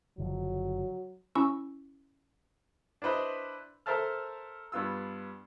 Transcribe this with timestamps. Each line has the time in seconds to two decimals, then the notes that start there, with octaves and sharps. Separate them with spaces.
0.18 F#1 D3 F3 F#3
1.35 C#4 E4 C#6 E6
3.02 D4 E4 B4 C5 D#5
3.86 A4 A#4 C5 E5 A5 F6
4.72 G2 B3 F4 E6